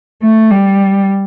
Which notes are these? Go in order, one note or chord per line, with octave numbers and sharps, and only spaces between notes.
A3
G3